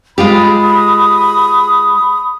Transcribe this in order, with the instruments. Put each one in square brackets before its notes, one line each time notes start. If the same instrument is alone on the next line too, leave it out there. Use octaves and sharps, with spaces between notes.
[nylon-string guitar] G#3 F4 G4 [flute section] B5 D#6